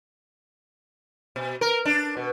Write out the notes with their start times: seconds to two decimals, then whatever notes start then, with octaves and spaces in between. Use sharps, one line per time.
1.36 B2
1.61 A#4
1.85 D4
2.17 B2